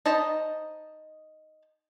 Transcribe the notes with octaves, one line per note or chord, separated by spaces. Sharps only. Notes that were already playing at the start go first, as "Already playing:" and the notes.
D#4 C5 D#5 A5 B5